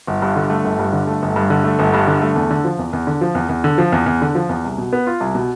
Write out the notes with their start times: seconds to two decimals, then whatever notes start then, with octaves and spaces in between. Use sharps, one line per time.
0.07 G1
0.22 G2
0.36 D3
0.50 A3
0.64 G1
0.79 G2
0.93 D3
1.07 A3
1.22 G1
1.36 G2
1.50 D3
1.64 A3
1.79 G1
1.93 G2
2.07 D3
2.22 A3
2.36 E2
2.51 D3
2.65 F3
2.79 E2
2.93 E2
3.07 D3
3.21 F3
3.35 E2
3.49 E2
3.64 D3
3.78 F3
3.92 E2
4.06 E2
4.22 D3
4.35 F3
4.49 E2
4.65 C2
4.78 B2
4.93 B3
5.07 F4
5.20 C2
5.35 B2